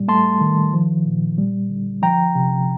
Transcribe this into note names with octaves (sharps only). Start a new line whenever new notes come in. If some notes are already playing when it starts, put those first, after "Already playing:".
Already playing: A2 G3
A3 A5 C6
D#3
F3
A#2
G3
D3
F3 G5 A#5
C3